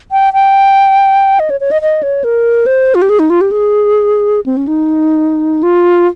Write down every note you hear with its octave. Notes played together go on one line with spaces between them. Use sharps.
G5
G5
D#5
C#5
C#5
D#5
D#5
C#5
A#4
C5
F4
G4
G#4
D#4
F4
G4
G#4
C4
C#4
D#4
F4